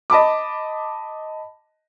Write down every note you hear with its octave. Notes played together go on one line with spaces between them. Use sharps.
D#5 A5 B5 D6